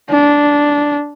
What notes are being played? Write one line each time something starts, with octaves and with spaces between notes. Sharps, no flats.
D4